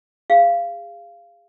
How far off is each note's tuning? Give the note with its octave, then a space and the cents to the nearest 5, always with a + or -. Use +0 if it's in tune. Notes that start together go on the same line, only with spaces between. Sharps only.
G#4 -30 F5 -15